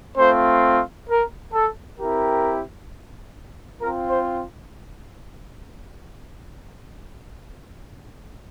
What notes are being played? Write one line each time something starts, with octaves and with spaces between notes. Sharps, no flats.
A3 C4 F4 C5
A#4
A4
C4 E4 G4 A#4
C4 F4 A#4
C5